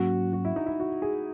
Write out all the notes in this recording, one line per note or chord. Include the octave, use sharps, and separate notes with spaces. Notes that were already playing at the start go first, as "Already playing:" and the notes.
Already playing: G#2 F#3 A#3 C#4 F#4
F#4
E4
D#4
E4
F#4
G#4